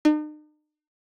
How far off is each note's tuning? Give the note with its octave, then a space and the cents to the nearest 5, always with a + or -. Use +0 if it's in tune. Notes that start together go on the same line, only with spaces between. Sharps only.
D#4 -45